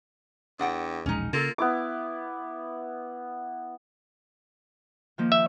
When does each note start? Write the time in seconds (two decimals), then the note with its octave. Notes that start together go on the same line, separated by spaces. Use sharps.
0.59 E2 D4 F#5 G5
1.06 E1 A#1 G#3 C#4 D#4
1.33 C#3 A#3 F4 A4
1.58 B3 E4 D6
5.18 D#3 F3 A#3
5.32 E5